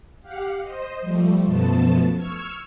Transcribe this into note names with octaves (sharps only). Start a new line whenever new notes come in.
G4 F5 F#5
C5 D#5
F3 G3 A3
F#2 B2 F3 A3 B3 A5
C#6 E6 F6 G#6